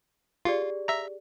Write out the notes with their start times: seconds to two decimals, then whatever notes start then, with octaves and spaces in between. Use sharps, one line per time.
0.45 F4 G4 G#4 D5
0.88 E5 A#5